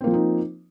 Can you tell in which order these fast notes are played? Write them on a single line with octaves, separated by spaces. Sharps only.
C4 A#3 F3 F4 D#4